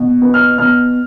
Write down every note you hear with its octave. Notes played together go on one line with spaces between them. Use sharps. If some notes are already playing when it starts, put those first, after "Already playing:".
Already playing: B2
B3
F6
B2 F6